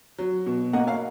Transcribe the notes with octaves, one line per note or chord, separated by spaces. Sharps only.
F#3
B2
A#3 D#5 F#5
C#5 F5